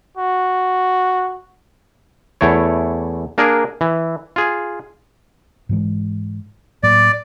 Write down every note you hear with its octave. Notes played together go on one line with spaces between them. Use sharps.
F#4
E2 A3 E4 C#5
A#3 D4 G#4 A#4
E3
F4 G#4
G#2 E3 G#3
A2 F#3 A#3 D5